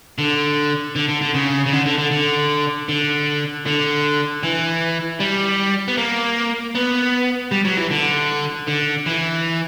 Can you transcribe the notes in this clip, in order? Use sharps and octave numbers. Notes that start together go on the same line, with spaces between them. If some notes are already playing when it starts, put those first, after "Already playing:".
D3
D3
D3
D3
C#3
C#3
D3
D3
D3
D3
D3
D3
E3
G3
B3
A#3
B3
G3
F#3
E3
D3
D3
E3